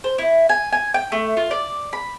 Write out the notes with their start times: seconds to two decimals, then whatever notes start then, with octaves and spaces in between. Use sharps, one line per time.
0.04 C5
0.18 E4
0.49 G#5
0.72 G#5
0.94 G5
1.12 A3
1.37 F4
1.51 D5
1.93 B5